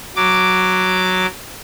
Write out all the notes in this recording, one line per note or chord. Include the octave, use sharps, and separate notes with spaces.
F#3 D6